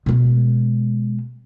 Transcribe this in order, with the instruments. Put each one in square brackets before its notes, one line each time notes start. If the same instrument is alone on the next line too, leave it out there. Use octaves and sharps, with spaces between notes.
[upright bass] B2 G#3